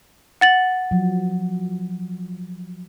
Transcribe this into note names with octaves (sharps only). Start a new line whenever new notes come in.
F#5 A6 F#7
F3 F#3